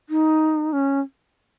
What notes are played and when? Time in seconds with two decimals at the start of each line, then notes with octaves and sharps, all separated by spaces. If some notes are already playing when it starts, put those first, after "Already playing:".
0.09 D#4
0.73 C#4